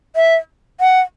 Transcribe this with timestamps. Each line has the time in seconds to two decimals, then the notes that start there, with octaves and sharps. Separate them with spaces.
0.16 E5
0.81 F#5